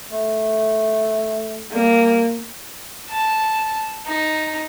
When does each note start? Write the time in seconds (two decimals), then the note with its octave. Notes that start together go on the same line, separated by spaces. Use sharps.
0.11 A3
1.73 G3 A#3
3.10 A5
4.06 D#4